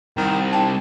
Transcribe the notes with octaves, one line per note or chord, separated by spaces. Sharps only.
C2 D#3
D4 D#4 G5 A5